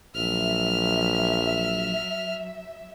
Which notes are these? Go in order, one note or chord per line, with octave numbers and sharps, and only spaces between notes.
A#1 F#3 E5 F6